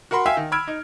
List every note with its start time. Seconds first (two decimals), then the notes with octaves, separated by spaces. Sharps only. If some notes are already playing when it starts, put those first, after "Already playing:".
0.11 F#4 A#4 F#5 B5 C6
0.26 E5 F5 G5 G#5 E6
0.37 D#3
0.52 B5 E6 F6 G#6 D7
0.67 D#4